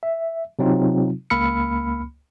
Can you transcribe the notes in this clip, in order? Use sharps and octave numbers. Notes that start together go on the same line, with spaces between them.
E5
C3 F#3 C4 D#4 F4
C#2 A#3 B5 E6 F6 C#7